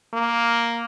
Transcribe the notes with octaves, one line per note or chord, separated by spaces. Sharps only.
A#3